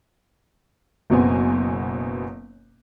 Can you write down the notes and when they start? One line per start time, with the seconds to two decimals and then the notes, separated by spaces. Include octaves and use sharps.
1.10 F#1 F#2 B2 B3 C4 G#5